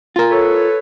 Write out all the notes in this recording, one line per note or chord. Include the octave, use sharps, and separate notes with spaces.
F4 A#4
A4 B4 C#5